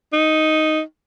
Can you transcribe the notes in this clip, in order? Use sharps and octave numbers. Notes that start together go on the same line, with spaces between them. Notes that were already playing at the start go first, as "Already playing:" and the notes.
D#4